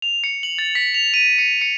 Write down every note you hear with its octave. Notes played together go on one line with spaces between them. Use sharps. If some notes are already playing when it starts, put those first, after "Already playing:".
F7
C#7
F#7
A6
B6
F7
D#7
C#7
C#7